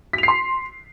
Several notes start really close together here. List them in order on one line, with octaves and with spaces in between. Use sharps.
B6 F7 C7 C6